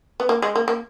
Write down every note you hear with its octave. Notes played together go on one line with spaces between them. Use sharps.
B3
A#3
G#3
A#3
A#3